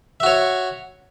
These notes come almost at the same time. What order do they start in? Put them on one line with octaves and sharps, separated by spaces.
E5 F#4 C#5